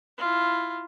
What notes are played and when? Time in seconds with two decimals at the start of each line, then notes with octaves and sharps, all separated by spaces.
0.18 E4 F4